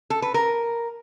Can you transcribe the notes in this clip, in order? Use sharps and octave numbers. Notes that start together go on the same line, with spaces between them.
A4
B4
A#4